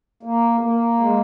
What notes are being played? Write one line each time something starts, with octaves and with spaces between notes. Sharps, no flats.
A#3
A#3
G#3